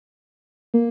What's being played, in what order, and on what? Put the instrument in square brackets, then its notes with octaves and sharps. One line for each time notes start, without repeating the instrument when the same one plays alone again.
[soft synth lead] A#3